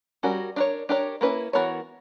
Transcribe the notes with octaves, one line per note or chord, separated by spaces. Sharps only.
G3 C#4 F#4 A#4
D4 A#4 C#5
D4 G4 A#4 C#5
A#3 C#4 E4 B4
E3 B3 F#4 A#4 C#5